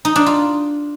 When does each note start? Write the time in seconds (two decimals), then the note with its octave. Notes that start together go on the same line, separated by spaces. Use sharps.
0.05 D#4
0.16 D4
0.26 F4